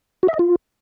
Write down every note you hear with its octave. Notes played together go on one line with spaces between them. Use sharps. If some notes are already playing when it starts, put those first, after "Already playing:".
F#4
E5
D#5
F4